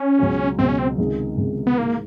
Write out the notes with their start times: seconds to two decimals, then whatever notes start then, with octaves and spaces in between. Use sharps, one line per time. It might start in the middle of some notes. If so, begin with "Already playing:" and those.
Already playing: C#4
0.19 C#2 B2 F#3
0.59 C#2 B2 F#3 C4
0.68 C#4
0.79 C4
0.98 C#2 C3 D#3 G#3
1.38 C#2 C3 D#3 G#3
1.67 B3
1.78 G#2 E3 G#3 A#3